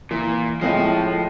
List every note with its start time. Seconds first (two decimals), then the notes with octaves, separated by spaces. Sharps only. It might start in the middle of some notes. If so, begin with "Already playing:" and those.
0.11 A#2 E3
0.61 A2 F3 G#3 C4 D#5